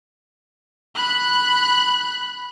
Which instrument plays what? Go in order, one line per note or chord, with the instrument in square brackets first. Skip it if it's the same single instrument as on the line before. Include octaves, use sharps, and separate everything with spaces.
[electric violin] B5 F#6